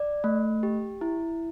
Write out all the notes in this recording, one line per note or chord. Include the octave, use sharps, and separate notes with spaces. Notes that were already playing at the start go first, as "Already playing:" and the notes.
Already playing: D5
A3
G4
E4